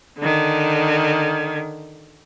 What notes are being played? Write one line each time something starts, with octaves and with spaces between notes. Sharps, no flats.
D3 D#3